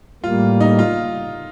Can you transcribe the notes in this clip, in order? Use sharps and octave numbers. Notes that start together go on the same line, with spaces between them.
A2 G3 A#3 F4
D#4
F4